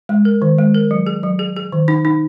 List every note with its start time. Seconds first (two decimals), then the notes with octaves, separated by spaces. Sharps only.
0.09 G#3
0.25 A#4
0.42 D#3
0.58 G#3
0.75 A#4
0.91 F#3
1.07 G#4
1.23 F#3
1.39 G#4
1.56 G#4
1.72 D#3
1.88 D#4
2.05 D#4